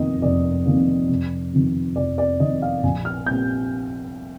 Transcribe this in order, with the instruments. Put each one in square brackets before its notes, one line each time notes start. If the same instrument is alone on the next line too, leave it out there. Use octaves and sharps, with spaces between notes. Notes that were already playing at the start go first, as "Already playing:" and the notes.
Already playing: [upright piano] F1 F2 D#3 A#3 D#5
F1 D5
F2 D#3 A#3
F1
F2 D#3
F1 D5
D5
F2 D#3 D#5
F5
A#1 G#5
F6
A#2 G3 C4 G6